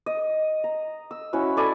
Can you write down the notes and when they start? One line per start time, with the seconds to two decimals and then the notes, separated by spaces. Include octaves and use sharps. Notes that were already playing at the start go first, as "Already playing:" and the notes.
0.06 D#5
0.64 A#5
1.11 E6
1.33 C#4 E4 F#4 F#5
1.57 A4 D5 G#5 B5